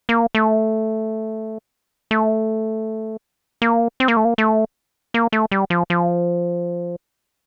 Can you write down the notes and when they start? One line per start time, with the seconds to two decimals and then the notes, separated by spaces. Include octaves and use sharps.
0.09 A#3
0.35 A3
2.11 A3
3.62 A#3
4.00 C4
4.08 A#3
4.17 A3
4.25 A#3
4.38 A3
5.14 A#3
5.32 A3
5.52 G3
5.70 F3
5.90 F3